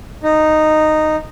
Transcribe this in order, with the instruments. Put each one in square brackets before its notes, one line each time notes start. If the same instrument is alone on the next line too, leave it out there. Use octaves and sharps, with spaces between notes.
[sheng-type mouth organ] D#4